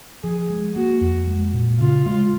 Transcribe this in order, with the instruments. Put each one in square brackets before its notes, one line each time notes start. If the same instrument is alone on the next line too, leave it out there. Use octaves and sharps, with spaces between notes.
[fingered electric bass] F3 [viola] G#4
[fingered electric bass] G#3
[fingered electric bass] A#3 [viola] F#4
[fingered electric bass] F2
G#3
A#2
[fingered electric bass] C#3 [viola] F4
[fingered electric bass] G#3